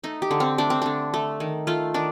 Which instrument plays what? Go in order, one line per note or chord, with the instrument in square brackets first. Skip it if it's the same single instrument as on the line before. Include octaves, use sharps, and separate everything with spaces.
[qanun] A3 D#4
G4
D3
C4
A3 D4
C4
D3 D4
A3
D#3
A3 F4
D#3 D4